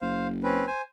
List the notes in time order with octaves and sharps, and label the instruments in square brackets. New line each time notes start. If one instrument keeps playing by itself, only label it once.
[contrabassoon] F#1 [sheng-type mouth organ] C5 F5
[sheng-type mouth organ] C4 C#4 B4
C5 G#5